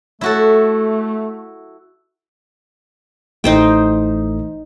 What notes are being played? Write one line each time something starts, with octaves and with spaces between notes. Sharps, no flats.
A3 E4 F#4 A4
A1 E3 A3 D#4 C5 G5